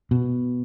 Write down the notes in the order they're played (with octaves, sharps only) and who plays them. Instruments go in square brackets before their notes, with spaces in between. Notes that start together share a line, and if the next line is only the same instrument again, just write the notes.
[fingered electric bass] B2